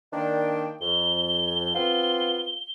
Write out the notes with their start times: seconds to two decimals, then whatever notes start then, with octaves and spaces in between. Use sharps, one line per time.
0.13 D#3 A#3 D4 G5
0.81 F2 G7
1.74 B3 C4 F4